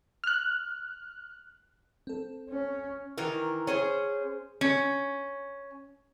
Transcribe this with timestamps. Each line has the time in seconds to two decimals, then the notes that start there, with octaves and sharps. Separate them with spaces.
0.24 F6 F#6
2.07 C4 A4
2.50 C#4
3.18 D#3 E3 A#4
3.67 C#4 G#4 C5
4.61 C#4